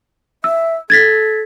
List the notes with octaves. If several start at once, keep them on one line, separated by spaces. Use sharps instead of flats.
E5 E6
A4 G#6 A6 B6